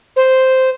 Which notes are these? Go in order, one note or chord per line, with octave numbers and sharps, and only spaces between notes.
C5